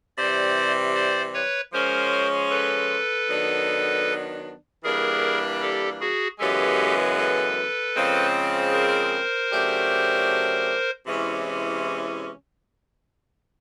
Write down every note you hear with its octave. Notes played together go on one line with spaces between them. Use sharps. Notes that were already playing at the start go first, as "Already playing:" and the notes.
C3 E3 G3 C5 D5
C5 D5
B4 C#5
F3 G#3 C#4 A#4 C5
A4 B4
D#3 F#3 B3 D4
E3 G3 A#3 D4 G#4 A#4
G4 A4
F#4 G#4
F#2 C#3 E3 G#3 B3 G4 A4
A4 B4
C#3 F3 G#3 C4
A#4 C5
C#3 F#3 A3 D4 G4
C3 E3 G#3 C#4 E4